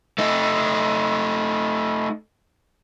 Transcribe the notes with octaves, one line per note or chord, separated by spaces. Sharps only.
A3 D#4